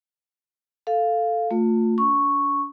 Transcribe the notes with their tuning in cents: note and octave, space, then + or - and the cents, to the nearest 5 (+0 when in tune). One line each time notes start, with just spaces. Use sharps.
A4 +0 F5 +0
A3 +25 F4 +25
D4 -45 C#6 +0